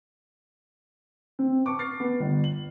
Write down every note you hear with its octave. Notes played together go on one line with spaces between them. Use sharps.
C4
A5 C#6 D6
F6 A6 C7
B3
G1
F#7